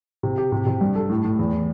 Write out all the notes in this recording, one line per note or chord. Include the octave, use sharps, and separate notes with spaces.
C3
G4
C3
C3
G2
A4
A2
A2
E2